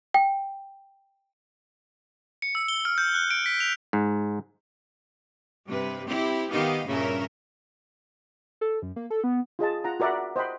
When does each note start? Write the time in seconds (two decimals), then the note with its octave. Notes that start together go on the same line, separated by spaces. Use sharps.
0.14 G5
2.42 C#7
2.55 E6
2.68 G7
2.85 F6
2.98 G6
3.14 F#6
3.31 D7
3.46 B6
3.60 F7
3.93 G#2
5.68 G2 C3 B4
6.08 C4 E4 G4
6.51 D#3 B3 D#4 G4 D#5 F5
6.86 G2 A#2 C#3 C#4 A#4 E5
8.61 A4
8.82 F#2
8.96 A#3
9.10 A4
9.24 B3
9.59 F4 G#4 D#5 A5
9.84 F4 F#5 A#5
10.00 F#4 A#4 D5 E5 F#5 B5
10.36 C5 D#5 F#5 G5 B5 C6